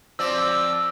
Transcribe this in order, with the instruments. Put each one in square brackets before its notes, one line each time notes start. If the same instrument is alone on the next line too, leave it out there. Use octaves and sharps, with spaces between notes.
[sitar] F3 C4 D5 [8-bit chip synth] E6